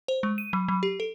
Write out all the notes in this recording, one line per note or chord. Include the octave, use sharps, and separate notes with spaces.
C5
G#3
D#7
F#3
F#3
G4
A4